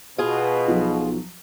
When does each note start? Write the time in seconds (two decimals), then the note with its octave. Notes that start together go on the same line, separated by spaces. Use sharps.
0.18 B2 F4 G#4
0.68 B1 F3 F#3